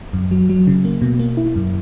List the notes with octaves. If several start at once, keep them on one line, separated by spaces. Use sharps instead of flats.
F#2
F#3
F#3
C#3
A#3
B2
A#3
E4
F#2